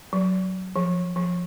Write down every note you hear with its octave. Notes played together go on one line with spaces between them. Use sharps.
F#3
F3
F3